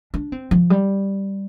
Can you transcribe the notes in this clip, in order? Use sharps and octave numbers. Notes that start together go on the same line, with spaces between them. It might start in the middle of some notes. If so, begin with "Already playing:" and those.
D4
C4
F3
G3